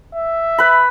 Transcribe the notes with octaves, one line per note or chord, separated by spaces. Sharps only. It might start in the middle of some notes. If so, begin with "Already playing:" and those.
E5
B4 B5